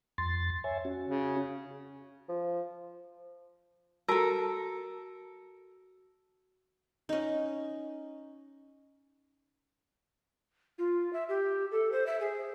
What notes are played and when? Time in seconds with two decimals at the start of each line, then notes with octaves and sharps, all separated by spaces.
0.18 F2 C6 A6
0.64 C#5 E5 G#5
0.85 C#4 F#4
1.08 C#3
2.29 F3
4.08 F#4 A4 A#4 A5 E6
7.09 C#4 D#4
10.78 F4
11.13 E5
11.29 G4
11.71 A4
11.92 C5
12.06 E5
12.20 G#4